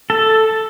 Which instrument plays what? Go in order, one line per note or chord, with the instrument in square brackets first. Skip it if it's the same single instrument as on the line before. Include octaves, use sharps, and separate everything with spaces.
[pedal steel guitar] A4